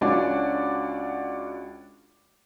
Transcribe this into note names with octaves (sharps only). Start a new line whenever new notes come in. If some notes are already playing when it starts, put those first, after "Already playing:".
C#2 C#4 D4 F#4 D5